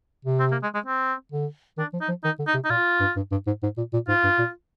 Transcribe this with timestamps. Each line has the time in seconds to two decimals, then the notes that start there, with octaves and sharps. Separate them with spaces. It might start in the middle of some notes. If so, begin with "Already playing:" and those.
0.25 C3
0.40 C4
0.52 A#3
0.63 G#3
0.74 G#3
0.86 C4
1.32 D3
1.77 D#3 D4
1.93 F3
2.01 D#4
2.08 F3
2.24 D#3 D#4
2.39 D3
2.47 D#4
2.54 C3
2.65 D#4
2.70 A#2 F4
3.00 G2
3.16 G2
3.32 G2
3.47 G#2
3.63 G#2
3.78 A#2
3.93 A#2
4.08 G#2 F4
4.24 G2
4.39 A#2